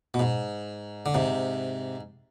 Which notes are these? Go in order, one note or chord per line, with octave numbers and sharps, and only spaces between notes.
B2
G#2
D3
G#2 C3